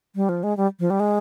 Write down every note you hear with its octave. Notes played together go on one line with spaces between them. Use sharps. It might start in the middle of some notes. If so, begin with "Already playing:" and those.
G3
F3
G#3
G3
F3
G3
G#3